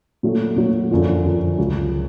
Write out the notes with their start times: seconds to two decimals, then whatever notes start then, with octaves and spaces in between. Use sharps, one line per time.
0.23 A#2 F#3 A3
0.56 A#2 F#3 A3
0.91 F#2 D3 F3
1.24 F#2 D3 F3
1.58 C#2 C#3 F#3